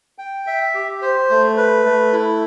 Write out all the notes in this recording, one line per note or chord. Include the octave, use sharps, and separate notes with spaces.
G5
E5
G4
C5
A3
B4
A3
E4